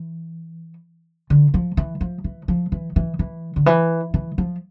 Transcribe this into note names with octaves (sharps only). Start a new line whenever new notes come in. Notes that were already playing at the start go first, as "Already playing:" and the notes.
Already playing: E3
D3
F3
E3
F3
E3
F3
E3
E3
E3
D3
E3
E3
F3